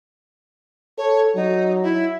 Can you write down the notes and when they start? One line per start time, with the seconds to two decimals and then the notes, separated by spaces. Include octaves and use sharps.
0.98 A4 C#5
1.36 F#3 D#4
1.83 E4